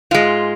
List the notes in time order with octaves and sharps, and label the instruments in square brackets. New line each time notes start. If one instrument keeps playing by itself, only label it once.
[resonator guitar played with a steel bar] G#2 G#3 F4